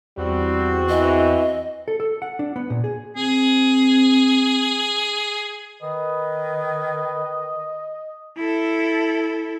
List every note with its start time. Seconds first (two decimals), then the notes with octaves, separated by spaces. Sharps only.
0.17 E2 G3 C4 F#4
0.89 E3 D#5
1.88 A4
2.00 A4
2.22 F#5
2.39 D4
2.56 B3
2.70 A#2
2.84 G#4
3.16 C4 G#4
5.82 D#3 B4 D#5
8.37 E4 A4